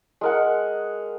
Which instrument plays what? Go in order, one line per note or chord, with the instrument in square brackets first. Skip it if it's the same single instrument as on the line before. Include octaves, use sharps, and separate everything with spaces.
[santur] G#3 A#4 F#5